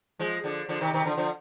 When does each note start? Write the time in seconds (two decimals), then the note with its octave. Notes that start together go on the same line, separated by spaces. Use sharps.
0.19 F3 G#3
0.44 D3 F3
0.69 D3 F3
0.81 C3 D#3
0.93 C3 D#3
1.05 D3 F3
1.17 D3 F3